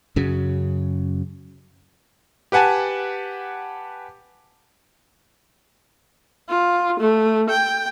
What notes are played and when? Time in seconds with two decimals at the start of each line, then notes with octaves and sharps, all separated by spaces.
0.16 F#2 C#3 F#3
2.52 G4 B4 F#5 G#5 A5
6.49 F4
7.00 A3
7.50 G5